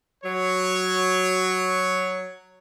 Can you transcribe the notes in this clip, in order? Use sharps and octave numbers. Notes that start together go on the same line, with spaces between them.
F#3 C#5